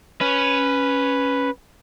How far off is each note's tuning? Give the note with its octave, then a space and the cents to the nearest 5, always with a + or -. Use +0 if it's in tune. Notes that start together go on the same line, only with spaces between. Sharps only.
C#4 +0 B4 +0